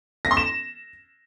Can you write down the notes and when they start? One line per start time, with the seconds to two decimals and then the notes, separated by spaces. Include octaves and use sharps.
0.25 A#6
0.31 C6
0.37 E7